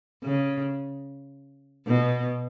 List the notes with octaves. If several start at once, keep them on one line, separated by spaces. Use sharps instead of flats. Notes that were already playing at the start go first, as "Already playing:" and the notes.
C#3
B2